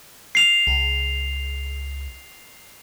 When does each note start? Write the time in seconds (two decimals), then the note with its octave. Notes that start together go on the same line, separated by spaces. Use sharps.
0.35 C7 F7
0.67 C#2